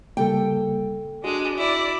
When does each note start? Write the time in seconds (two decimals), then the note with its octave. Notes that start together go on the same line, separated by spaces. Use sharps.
0.17 C#3 G3 A#3 A4 G5
1.24 G#3 D4 F#4
1.58 E4 D5